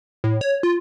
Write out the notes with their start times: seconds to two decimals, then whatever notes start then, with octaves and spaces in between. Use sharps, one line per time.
0.24 A2
0.41 C#5
0.63 F4